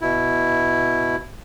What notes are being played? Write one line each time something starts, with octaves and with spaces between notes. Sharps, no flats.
B2 E4